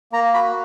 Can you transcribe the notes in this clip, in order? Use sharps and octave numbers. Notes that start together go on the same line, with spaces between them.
A#3 A#5
F#4 B5